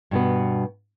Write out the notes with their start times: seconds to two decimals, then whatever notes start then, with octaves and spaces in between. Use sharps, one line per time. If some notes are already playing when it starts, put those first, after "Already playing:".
0.11 G2 B2 B3